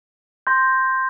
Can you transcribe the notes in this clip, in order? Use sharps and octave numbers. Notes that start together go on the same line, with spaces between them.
C6 G6 A#6